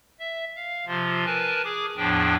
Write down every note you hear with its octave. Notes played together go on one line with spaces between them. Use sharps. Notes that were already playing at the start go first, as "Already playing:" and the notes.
E5
F5
C3 F3 F4
A#4 B4 G#5 A5
G#4 D6
E2 A2 F3 D4 G5